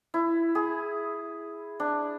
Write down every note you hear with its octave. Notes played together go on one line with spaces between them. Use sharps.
E4
G#4
D4